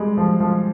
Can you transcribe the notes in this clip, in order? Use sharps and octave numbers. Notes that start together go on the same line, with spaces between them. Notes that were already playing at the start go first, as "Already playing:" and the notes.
Already playing: G3 G#3
F3
F3